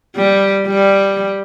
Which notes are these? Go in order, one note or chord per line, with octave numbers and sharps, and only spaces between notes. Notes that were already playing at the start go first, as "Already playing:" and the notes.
G3
G3